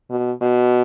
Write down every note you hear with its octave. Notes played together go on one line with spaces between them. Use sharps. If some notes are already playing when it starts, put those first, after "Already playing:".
B2
B2